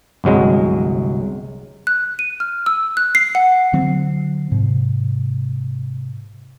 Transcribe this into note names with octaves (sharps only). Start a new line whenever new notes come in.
G1 C2 F#3 G#3
F#6
D#7
F6
E6
F#6
C7
F#5
D3 F#3 C4
G#2 C3